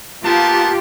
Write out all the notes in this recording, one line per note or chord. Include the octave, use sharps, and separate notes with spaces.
A#3 B3 F4 G4 A5